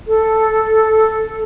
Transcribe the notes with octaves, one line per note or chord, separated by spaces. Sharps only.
A4